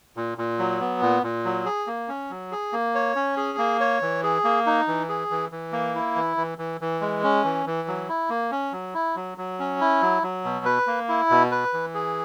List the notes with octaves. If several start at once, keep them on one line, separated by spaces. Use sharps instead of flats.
A#2
A#2
F#3
B3
A#2
A#2
F#3
G#4
A#3
C#4
F#3
G#4
A#3
C#5
C#4
G#4
A#3
C#5
E3
G#4
A#3
D#4
E3
G#4
E3
E3
A#3
E4
E3
E3
E3
E3
G#3
C#4
E3
E3
F#3
E4
A#3
C#4
F#3
E4
F#3
F#3
C#4
E4
F#3
F#3
B2
B4
A#3
E4
B2
B4
E3
G#4